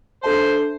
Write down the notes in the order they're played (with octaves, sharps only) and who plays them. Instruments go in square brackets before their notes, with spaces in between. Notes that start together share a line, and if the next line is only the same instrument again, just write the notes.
[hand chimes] D4 A4 E5 A5 [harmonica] C5